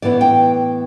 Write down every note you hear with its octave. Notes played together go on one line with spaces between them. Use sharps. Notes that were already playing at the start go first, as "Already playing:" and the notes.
A2 E3 B3 E4 D5
G5